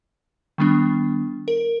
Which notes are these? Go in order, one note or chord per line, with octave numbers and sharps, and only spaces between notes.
D#3 G3 B3 D4
A#4